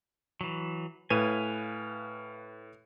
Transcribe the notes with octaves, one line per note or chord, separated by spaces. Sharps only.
E3 F#3
A2 B4 F5 G#5 D#7